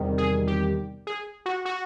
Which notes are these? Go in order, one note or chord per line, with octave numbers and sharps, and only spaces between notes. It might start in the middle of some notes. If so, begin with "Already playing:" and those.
Already playing: E2 C3 D#3 G3
G#4
G4
G#4
F#4
F#4